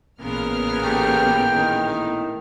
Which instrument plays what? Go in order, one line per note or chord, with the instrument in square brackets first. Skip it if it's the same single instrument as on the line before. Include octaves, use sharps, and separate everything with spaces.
[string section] A1 B3 F6 [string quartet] A#2 C#3 A#4
[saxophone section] A3 C#4 G4 [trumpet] G5
[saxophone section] A2 D#3